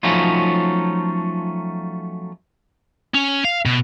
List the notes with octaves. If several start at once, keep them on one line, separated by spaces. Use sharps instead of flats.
F3 F#3 A3 C#4 D#4 F4
C#4
F5
B2